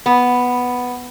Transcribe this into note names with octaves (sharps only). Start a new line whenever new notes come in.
B3